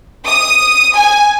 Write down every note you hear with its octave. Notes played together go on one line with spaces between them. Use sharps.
D#6
G#5